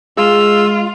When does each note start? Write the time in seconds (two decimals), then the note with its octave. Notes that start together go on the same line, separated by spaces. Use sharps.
0.17 G#3 F4 G#4 E6